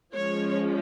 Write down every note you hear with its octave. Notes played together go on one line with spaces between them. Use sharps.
F3 G#3 C#4 C#5